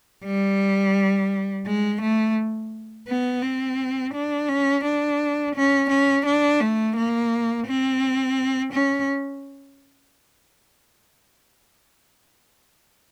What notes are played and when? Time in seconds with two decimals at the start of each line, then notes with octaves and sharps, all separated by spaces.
0.25 G3
1.66 G#3
2.02 A3
3.08 B3
3.43 C4
4.14 D4
4.49 C#4
4.85 D4
5.55 C#4
5.90 C#4
6.26 D4
6.61 A3
6.96 A#3
7.67 C4
8.73 C#4